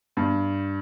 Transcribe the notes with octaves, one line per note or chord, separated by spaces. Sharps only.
G2